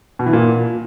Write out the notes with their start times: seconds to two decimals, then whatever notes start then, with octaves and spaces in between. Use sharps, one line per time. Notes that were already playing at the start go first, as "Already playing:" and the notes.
0.19 B2
0.26 E3
0.33 A#2